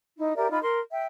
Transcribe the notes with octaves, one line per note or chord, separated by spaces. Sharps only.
D#4 E4
G4 A#4 D5 E5
D#4 F4 B5
A#4 C6
E5 G5